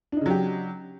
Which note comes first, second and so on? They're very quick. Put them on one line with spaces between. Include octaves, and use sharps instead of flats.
D4 D#4 C#3 F#3 G4